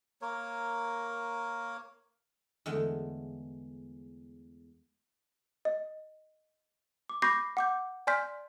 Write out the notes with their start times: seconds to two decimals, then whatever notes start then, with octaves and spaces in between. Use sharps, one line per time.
0.22 A#3 A#4 C#5
2.66 E2 D3 G#3 A3
5.65 D#5
7.09 D6
7.22 B5 C#6 D6 G6 A#6 C7
7.57 F#5 D6 G6
8.07 D5 G#5 C6 F6 G6 B6